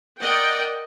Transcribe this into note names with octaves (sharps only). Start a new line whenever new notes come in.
A#4 D5 D#5 F#5 G5